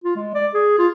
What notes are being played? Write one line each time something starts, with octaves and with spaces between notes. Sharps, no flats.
F4
G#3
D5
G#4
F4